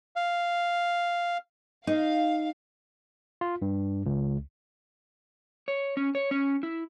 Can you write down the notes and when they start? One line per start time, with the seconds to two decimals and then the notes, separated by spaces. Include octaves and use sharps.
0.16 F5
1.87 D#4 F5
3.41 F4
3.62 G2
4.06 C#2
5.68 C#5
5.97 C#4
6.15 C#5
6.31 C#4
6.63 E4